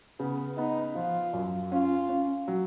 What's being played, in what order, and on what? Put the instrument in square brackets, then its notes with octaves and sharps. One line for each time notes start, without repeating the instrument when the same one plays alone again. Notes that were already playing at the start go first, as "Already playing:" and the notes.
[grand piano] C#3 [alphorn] B3
[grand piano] B3 [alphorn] D#4
[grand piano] F3 [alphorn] F4
[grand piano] F#2
[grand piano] C#4 [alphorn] F4
[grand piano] C#4
F#3